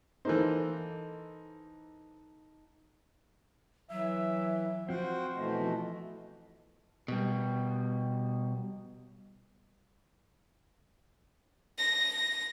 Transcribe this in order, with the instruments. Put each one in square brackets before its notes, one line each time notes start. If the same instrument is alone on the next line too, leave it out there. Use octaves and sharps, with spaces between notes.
[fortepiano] E3 A#3 C5 [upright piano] D#4 A4
[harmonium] E3 [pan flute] F#3 [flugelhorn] E5
[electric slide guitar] F3 C4 [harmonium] F#4 F#5 G5 [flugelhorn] C5
[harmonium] B2 E3 A3 [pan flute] D#5
[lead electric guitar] B2 G3
[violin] A#6